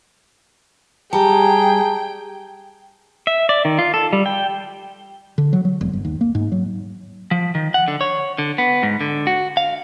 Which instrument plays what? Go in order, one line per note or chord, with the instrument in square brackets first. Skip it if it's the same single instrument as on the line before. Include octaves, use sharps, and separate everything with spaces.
[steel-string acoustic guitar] G3 [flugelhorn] G#4 [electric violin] G5 [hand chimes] A5 A#5
[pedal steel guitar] E5
D5
D#3
F4
A4
G3
G5
[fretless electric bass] D3
F#3
F#3
E1
G1
D#2
A#3
G#2
F#3
[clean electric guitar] F3
D#3
F#5
D3
C#5
D3
B3
G#2
D3
F#4
F5